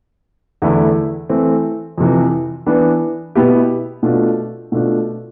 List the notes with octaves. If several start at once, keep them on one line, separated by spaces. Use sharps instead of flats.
E2 D3 A3 E4
E3 A3 C4
F2 C3 E3
E3 B3 D4
B2 B3 E4 G4
B2 A3 D4 F4
B2 A3 D4 F4